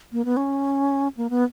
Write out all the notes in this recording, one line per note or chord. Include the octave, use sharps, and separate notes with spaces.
A#3
B3
C#4
A#3
B3